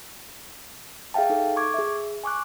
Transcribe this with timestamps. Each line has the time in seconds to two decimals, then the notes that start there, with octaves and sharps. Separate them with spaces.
1.14 G#4 E5 F5 G5 A5
1.30 D#4 A4
1.57 C#6 D6 G#6
1.74 G#4 E5
2.24 G#5 C#6 D6 F#6